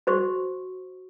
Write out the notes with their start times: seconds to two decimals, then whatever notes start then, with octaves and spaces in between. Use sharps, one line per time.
0.07 F#4 C5 C#6